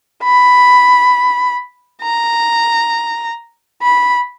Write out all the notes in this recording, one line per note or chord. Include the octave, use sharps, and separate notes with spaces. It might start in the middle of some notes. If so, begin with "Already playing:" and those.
B5
A#5
B5